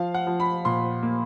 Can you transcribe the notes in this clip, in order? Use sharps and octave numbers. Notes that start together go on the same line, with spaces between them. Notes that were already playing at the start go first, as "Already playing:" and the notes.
Already playing: F3 F5
F#5
F3
B5
A#2 C6
A#3